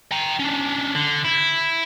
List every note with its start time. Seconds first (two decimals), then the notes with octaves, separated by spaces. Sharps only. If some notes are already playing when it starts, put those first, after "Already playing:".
0.12 G5 A#5
0.39 C#4 D4
0.95 D3
1.25 E4